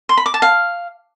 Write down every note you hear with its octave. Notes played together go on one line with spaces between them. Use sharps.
C6
B5
D6
A5
F5